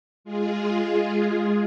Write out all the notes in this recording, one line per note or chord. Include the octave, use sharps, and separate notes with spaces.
G#3 F4 G#4